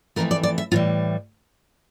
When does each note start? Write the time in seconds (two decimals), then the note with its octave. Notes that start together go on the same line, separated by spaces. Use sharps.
0.16 F2 E3 A3 A#4
0.31 D5
0.43 D5
0.58 E5
0.71 A2 E3 G3 F4